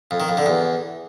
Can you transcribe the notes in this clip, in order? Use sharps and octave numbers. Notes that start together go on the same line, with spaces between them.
F2
D#3
F2
D3
E2